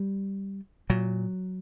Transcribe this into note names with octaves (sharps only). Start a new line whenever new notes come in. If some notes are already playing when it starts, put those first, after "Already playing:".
Already playing: G3
A#2 F#3